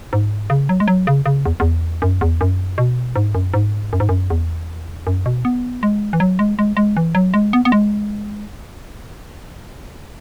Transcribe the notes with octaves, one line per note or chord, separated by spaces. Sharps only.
G#2
C#3
F#3
G#3
F#3
C#3
C#3
E2
E2
F#2
E2
F#2
B2
G#2
F#2
G#2
F#2
G#2
F#2
E2
F#2
B2
B3
G#3
E3
F#3
G#3
G#3
G#3
E3
F#3
G#3
B3
B3
G#3